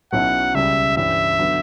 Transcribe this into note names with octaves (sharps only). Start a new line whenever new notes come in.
B1 B2 F#3 C#4 E4 F#5
C#2 C#3 G3 E5
G2 E3 G3 C#4 E4 E5
D3 F#3 B3